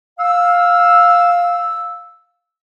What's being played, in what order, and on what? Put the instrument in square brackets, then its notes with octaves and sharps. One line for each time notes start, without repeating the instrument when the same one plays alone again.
[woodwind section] F5 E6